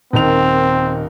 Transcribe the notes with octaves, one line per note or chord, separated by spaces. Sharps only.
D#1 D#3 C4 F7